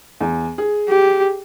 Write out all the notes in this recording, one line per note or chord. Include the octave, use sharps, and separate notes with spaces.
E2
G#4
G4